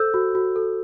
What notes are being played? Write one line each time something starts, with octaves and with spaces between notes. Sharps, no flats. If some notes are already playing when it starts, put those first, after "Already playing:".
Already playing: A4 C5 E6 G6
F#4
F#4
A4